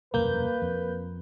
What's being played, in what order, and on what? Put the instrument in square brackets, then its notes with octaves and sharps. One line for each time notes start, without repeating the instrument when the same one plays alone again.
[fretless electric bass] E1 C2 F#2 [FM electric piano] A#3 G6 [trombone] B4
[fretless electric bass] F2